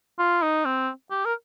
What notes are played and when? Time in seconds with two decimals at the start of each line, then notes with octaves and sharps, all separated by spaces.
0.19 F4
0.42 D#4
0.65 C4
1.11 G4
1.25 A#4